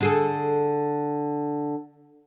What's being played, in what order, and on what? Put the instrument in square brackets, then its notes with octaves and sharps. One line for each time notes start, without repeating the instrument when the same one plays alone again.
[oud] D3 G#4 A4